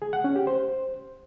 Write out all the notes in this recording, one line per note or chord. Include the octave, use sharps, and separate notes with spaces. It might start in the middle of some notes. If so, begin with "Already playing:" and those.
G#4
F#5
C#4
G4
C5